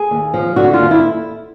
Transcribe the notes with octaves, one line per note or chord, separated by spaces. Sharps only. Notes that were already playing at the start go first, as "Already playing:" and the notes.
Already playing: G#4
D#2
F3
D3 F#4
F4
D#2
E4